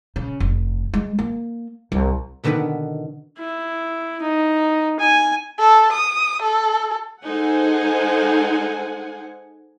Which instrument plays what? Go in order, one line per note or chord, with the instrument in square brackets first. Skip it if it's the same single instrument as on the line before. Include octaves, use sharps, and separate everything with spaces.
[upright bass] C#3
F1
G#3
A#3
C2
[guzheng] B2 D3 D#3 B3 B4 B5
[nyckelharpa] E4
D#4
G#5
[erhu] A4
D#6
A4
[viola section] G#3 D#4 A4 C5 F#5 G#5